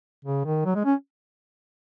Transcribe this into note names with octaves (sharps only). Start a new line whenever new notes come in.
C#3
D#3
F#3
G#3
C#4